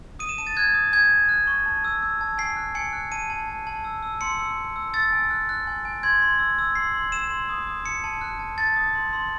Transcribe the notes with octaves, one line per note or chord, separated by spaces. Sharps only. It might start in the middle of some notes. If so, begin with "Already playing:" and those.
D#6 D#7
E7
A5 D#7
A6
F#6 G#6
D#6
G#5 G#6
G#5
F#6
C#6
A5
E6
E6
A5
G#5 C7
F#6
G#5 C#7
F#6
A5 D#7
A5
A5
A5
E6
E6
C6 C#7
E6
E6
E6
E6 A6
G#5
F#6
F#6
G#5
G#5
C6 G#6
C6
E6
E6
C6 C7
C6
E6 E7
C6
D#6
D#6
A5 C#7
A5
F#6
A5
A5 A6
D#6
C6
C6